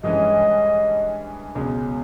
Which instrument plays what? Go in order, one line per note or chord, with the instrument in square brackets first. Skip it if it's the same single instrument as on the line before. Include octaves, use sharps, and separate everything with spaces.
[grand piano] G2 E3 G#3 C#4 [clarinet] D#5
[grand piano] C#2 B2 G#3 C#4 G#4